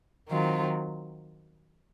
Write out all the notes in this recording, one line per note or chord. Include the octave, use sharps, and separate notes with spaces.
D#3 F#3 C4 F4